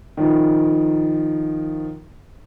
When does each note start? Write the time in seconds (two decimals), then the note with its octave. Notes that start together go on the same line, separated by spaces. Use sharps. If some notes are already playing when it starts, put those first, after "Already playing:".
0.17 D#3 F3